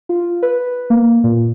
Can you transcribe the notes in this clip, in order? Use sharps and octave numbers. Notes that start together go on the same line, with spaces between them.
F4
B4
A#3
A#2